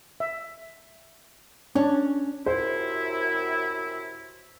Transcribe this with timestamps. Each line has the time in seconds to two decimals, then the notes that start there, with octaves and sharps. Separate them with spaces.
0.20 E5
1.75 C#4 D4
2.46 F#2 C3 E4 C5